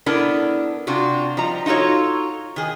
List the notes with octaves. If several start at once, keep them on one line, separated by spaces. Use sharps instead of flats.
B3 D4 E4 A4 A#4
C3 D4 F4 F#4
F3 G3 D#4 A#5
D#4 F4 F#4 A4 C#5
D#3 G#4